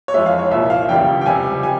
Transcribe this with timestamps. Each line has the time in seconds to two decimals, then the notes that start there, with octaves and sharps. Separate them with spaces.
0.08 C#5
0.14 F2 E3 G#3 E5
0.26 F5
0.39 C#5
0.51 C2 A#2 F3 E5
0.70 F5
0.89 E1 E2 C#3 G3 G5
1.21 G5
1.26 C#2 C3 G3 G#5
1.63 G3 G#5